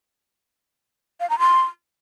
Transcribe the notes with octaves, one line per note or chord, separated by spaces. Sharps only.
F5
A#5
C6